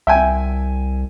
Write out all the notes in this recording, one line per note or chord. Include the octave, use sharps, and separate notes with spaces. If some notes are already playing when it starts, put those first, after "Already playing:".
C2 E5 G5 G#5